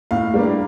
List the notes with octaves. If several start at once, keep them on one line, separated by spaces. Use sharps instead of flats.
A2 F5
G3 A#3 D4